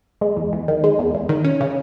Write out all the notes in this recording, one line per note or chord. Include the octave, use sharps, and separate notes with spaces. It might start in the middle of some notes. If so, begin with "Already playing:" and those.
G#3
E2
E2
D#3
G#3
E2
E2
D#3
C#4
C#3